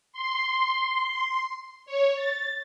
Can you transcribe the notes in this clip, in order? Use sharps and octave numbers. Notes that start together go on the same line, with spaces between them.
C6
C#5
A6